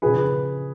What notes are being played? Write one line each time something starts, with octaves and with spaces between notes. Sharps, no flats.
C#3 F3 G#4 B4